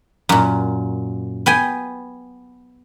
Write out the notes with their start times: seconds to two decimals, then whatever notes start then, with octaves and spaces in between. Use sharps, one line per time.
0.29 F#2 A#2
1.46 B3 G5 G#5